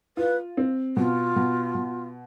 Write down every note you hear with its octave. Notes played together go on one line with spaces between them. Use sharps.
F4 B4
C4
B2 F4
B2
B2